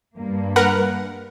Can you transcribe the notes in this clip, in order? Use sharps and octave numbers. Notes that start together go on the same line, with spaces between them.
G2 A#3
A#4 B4 F#5